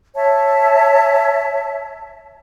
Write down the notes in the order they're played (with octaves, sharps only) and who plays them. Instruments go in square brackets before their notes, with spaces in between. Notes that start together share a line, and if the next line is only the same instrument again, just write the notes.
[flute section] C#5 E5 A5